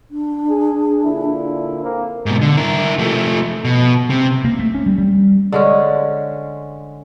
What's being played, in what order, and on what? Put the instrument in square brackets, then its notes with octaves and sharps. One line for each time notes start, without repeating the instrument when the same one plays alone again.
[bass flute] D4
[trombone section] G#4
A#2 D3 E4
A#3 C4
[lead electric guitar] G#2 B2
D3
E4 A#4
F3 A3
B2
C3
[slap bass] A#3
A3
C#4
G3
G3
[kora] D3 G#3 C#4